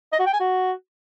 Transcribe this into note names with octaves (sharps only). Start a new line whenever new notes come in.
D#5
F#4
G5
G#5
F#4